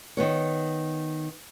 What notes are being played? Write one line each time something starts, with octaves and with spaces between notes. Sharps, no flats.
D#3 B3 C#5